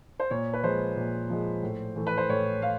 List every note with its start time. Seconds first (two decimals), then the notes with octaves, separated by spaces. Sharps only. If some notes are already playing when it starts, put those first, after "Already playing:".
0.20 C5
0.31 A#2 C#5
0.53 B4
0.63 F3 G#3 C5
0.96 A#2
1.30 F3 G#3
1.63 A2
1.96 E3 A3
2.07 B4
2.17 C5
2.29 A2 C#5
2.62 A3 F5